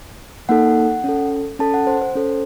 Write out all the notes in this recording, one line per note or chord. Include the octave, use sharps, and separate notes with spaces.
A#3 D#4 A4 F#5
C#4 A4
C#4 A4 A5
F#5
C5
C5
C#4 A4